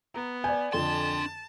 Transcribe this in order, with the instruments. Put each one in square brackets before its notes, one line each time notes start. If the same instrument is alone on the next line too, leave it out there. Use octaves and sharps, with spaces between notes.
[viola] B3 [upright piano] A#5
[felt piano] D5 G#5 [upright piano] G6
[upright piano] F2 D3 [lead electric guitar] D4 C6 [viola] A5